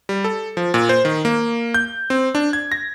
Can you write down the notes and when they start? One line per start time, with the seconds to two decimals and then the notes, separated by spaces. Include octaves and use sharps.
0.09 G3
0.24 A4
0.57 F3
0.74 A#2
0.89 C5
1.05 D#3
1.25 A#3
1.74 G6
2.10 C4
2.35 D4
2.53 G#6
2.72 A#6